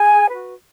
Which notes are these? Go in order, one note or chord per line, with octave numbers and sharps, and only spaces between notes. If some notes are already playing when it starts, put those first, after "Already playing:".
Already playing: G#4 G#5
F#4 B4